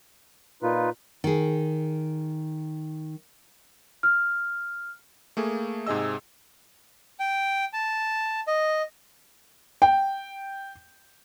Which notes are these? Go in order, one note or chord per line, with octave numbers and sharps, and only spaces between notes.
A#2 D#4 F4 B4
D#3 G#4
F6
A3 A#3 G#4
G#2 C3 G#4 D#5 E6
G5
A5
D#5
G5